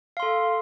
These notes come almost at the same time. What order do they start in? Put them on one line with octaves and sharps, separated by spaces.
F5 C6 A4